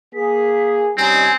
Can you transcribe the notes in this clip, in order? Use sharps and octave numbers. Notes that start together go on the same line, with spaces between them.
A#3 G#4 B6
G3 C4 C#4 D#4 G#5